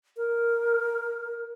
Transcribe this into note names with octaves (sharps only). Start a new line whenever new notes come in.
A#4